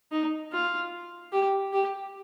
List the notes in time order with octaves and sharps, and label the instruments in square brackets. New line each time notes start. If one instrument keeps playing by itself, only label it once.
[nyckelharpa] D#4
F4
G4
G4